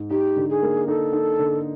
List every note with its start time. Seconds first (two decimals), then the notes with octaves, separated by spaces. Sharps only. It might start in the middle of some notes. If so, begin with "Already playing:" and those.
Already playing: G#2
0.10 D#4 G4
0.36 D3
0.50 G#4
0.62 A#3
0.88 D#4 A4
1.13 D#4
1.39 D3